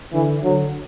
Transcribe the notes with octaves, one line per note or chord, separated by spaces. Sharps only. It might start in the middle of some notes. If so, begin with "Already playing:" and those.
D3 E3
D3 F#3